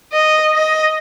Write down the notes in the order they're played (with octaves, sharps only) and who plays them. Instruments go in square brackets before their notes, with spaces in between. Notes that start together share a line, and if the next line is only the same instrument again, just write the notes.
[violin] D#5
D#5